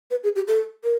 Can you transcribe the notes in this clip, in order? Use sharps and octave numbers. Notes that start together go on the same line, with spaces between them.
B4
G#4
G4
A4
A#4